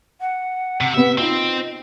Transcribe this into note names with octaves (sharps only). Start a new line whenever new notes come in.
F#5
C3
C3 B3 E5
C4 D#4 F4 D#5